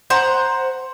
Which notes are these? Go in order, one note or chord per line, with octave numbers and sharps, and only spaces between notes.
C5 F#5 A#5